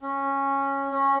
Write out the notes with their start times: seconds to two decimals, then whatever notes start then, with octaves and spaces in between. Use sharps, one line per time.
0.02 C#4
0.92 C#4